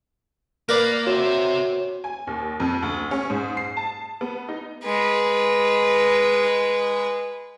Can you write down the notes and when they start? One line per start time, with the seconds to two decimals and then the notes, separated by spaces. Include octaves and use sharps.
0.69 A#3 A#4 B4 D5 F5
1.07 C4 F#4 C#5 E5
2.04 G#5
2.27 D#2
2.60 F2
2.82 D2
3.11 C#4
3.30 G#2
3.57 C7
3.77 A5
4.21 B3
4.49 D#4
4.84 G#3 B4